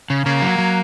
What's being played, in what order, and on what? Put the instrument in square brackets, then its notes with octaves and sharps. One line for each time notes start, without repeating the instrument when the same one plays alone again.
[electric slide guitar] C#3
[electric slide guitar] C#3 [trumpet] A#3
[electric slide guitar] F#3
F#3